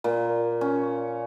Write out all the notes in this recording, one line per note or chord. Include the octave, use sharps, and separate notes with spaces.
A#2
C#4